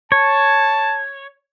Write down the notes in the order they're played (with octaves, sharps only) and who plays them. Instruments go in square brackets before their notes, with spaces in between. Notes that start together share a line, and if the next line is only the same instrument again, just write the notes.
[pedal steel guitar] C#5 [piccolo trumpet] A5